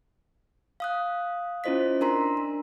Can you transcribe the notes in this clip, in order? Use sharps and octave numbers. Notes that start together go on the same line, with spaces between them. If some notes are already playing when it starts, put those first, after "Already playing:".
F5 D#6 F#6
C#4 E4 F4 C5 D#5 B6
D4 A#4 A#5 C6
D4